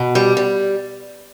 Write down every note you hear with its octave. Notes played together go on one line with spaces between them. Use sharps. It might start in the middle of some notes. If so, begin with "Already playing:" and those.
Already playing: B2
G3
G3